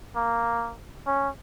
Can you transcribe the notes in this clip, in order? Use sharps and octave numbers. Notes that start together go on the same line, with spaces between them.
A#3
C#4